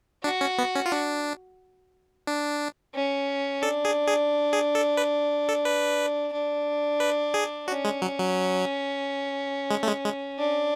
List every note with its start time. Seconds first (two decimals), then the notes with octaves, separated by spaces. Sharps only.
0.24 D4 F#4
0.41 C#4
0.58 B3
0.75 C#4
0.86 F4
0.92 D4
2.27 D4
2.94 C#4
3.62 D4 A4
3.85 G#4
4.07 G#4
4.53 G#4
4.75 A4
4.97 B4
5.49 A4
5.65 B4
6.33 D4
7.00 B4
7.34 G#4
7.67 C#4 F#4
7.85 G#3
8.02 F#3
8.19 F#3
9.70 G#3
9.83 A3
9.88 G#3
10.05 G#3
10.39 D4